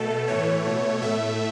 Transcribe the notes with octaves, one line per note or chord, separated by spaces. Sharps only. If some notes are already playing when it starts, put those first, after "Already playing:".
Already playing: B2 A3 A4
A2 E3 A3 C#5
B2 A3
A2 A3 E5